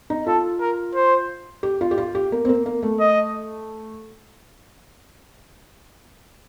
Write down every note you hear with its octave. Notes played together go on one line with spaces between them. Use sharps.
D#4
F4 A4
A#4
C5
G4
F4
G4
F4
G4
A#3
C4
A#3
A#3
A3
D#5